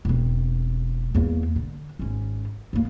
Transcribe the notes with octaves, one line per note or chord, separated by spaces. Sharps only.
E1 C4
E2 A#3
D3
G#1 C#4
D#2 A#3